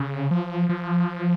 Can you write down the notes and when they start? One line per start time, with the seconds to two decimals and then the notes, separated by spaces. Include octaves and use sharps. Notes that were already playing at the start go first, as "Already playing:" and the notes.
Already playing: C#3
0.31 F3
0.69 F3